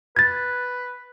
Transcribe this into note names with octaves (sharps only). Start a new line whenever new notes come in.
B4 G#6 A6